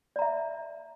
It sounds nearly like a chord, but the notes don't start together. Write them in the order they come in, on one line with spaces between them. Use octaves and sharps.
D5 A#5 E5